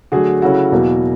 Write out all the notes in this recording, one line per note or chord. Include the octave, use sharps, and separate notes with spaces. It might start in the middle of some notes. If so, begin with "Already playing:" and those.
D3 F#3 A3 F#4 G#4
C#3 F#3 A3 C#4 E4 F#4
E2 B2 F#3 A#3